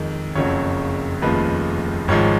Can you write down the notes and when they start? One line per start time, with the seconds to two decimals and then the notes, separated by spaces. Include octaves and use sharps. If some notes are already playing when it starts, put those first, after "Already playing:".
Already playing: F2 D#3 G#3
0.35 F#1 F2 C#3 F#3 C#5
1.22 F1 D#2 C#3 F3 G#3 B4
2.08 G#1 G#2 F3 G#3 C#5